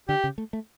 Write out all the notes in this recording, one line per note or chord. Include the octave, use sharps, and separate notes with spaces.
D3 G4
C#3
A3
A3